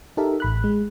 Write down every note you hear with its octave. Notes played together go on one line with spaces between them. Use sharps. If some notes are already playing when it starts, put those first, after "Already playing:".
D#4 G4 A4 A#4 E5
A1 B5 F#6
G#3